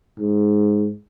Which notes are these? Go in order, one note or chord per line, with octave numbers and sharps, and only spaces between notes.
G#2